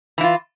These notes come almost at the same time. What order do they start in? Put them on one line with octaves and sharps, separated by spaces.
E3 E4 F4